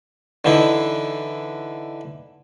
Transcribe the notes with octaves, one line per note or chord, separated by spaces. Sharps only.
D3 E3 D#4 E4